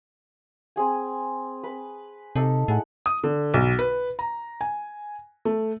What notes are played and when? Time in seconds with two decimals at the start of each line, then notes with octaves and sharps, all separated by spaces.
0.76 C4 G#4 G#5
1.63 B4
2.36 C3 D#4 A4
2.68 A2 E4 G#4 F#5
3.06 D#6
3.24 D3
3.54 B1
3.79 B4
4.19 A#5
4.61 G#5
5.45 A3